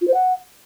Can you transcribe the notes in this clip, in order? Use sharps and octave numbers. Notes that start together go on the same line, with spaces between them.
F4
C5
F#5